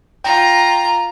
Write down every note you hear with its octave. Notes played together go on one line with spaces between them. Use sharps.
F4 G5 A#5